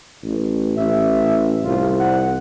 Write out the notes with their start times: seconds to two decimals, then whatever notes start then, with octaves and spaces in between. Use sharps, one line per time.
0.23 A1
0.77 A1 E5
1.64 C2 F4
2.00 F#5